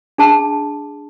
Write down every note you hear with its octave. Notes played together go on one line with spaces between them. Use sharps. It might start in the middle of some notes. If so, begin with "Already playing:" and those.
D4 G#4 A5